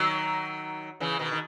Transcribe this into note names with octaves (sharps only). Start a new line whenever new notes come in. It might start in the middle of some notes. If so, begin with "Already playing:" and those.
Already playing: D#3 F#3
C#3 E3
B2 D#3
D#3